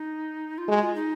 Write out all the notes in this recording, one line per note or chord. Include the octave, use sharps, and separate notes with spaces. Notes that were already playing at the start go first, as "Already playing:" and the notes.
Already playing: D#4
F4
G#3 F#4
F4
D#4